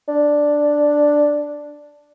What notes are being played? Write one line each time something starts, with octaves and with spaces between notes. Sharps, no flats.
D4